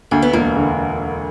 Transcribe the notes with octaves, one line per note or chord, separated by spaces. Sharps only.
D2 A#3
B3
E1 A#3
D3